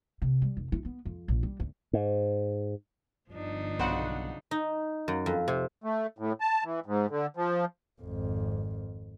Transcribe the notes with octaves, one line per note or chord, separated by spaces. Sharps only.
C3
G3
F1
E4
B3
F2
A#1
G3
D2
G#2
G1 F3 D4 D#4
B1 C#3 C4 C5 F#5
D#4
F#2
F2
C3
A3
A2
A5
E3
G#2
D3
F3
G#1 F2